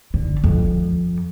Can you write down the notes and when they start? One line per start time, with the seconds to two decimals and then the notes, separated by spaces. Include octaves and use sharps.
0.14 D3
0.44 F2